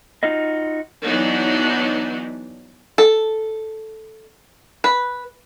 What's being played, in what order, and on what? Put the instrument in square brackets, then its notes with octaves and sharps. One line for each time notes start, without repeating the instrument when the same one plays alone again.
[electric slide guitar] D#4 F4 F#4 D#5
[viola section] E3 F#3 B3 D4 D#4
[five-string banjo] A4
B4